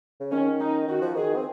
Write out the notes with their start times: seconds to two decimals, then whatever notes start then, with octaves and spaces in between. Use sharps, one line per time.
0.20 C#3
0.31 D#3 C#4
0.60 D#4
0.88 D#3 F#4
1.01 F3
1.15 D#3 G#4
1.36 C4